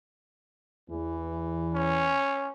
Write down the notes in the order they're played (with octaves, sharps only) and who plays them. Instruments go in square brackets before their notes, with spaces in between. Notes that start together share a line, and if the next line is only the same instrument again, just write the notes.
[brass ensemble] E2 [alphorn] E3
[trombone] C#4